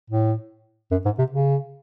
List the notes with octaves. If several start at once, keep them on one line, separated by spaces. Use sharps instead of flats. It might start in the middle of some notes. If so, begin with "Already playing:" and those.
A2
F#2
G#2
C3
C#3